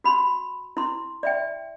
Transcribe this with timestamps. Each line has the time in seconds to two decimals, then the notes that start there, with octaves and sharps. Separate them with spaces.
0.04 F#4 B5 C6
0.77 E4 C6
1.23 D5 E5 G5